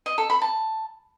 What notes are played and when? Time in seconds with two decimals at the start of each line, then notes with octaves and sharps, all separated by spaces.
0.06 D#5
0.18 A4
0.30 B5
0.42 A5